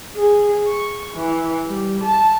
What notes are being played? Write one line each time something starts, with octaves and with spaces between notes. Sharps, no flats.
G#4
C#6
E3
G3
A5